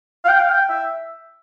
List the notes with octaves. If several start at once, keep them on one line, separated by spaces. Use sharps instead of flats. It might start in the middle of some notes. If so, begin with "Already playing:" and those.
F5
G5
F5
G5
E5